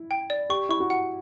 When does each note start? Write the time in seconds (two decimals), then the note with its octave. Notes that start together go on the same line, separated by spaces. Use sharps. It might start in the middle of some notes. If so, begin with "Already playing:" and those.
Already playing: E4
0.11 G5
0.30 D5
0.50 G4 C#6
0.69 E4 C#6
0.80 F#4
0.90 F#5